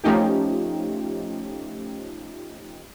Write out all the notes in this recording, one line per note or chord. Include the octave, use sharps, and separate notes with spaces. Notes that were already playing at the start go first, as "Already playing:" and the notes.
F3 A3 C#4 D#4 G4